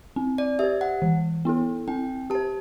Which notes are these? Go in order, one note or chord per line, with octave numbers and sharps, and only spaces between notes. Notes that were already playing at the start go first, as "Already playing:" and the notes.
C4
D5
G4 C5 E5
F#5
E3
B3 E4 A4
C4 G5
G4 C5 A5